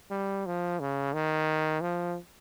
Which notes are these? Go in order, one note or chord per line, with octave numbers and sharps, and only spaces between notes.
G3
F3
C#3
D#3
F3